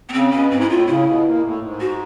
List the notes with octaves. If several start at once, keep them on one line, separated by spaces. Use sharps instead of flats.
B3
C#3 C4
B2 C#4
G#2 C4
E4
A2 F4
C#3 E4
B2
A#2
A2
G#2
F#4